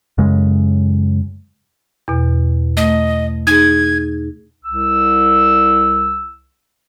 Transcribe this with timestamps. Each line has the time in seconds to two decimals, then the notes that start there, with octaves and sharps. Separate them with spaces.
0.18 F#2 C#3 G#3
2.08 E2 B2
2.77 A3 D#5
3.47 D#4 G#4 G#6
4.63 C2 E6